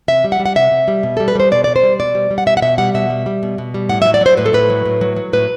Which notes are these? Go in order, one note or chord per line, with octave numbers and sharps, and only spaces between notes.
C3 E5
G3
F#5
G3
F#5
C3 E5
C3
G3
B2
G3 A4
B4
G3 C5
B2 D5
B2 D5
C5
G3
B2 D5
G3
G3
F#5
B2 E5
F#5
B2 E5
G3 F#5
B2 E5
G3
G3
B2
B2
G3
A2 F#5
E5
F#3
D5
F#3 C5
A2 B4
A4
A2 B4
F#3
A2
F#3
F#3
A2 B4